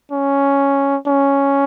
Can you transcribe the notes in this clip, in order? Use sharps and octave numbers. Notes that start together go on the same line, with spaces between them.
C#4
C#4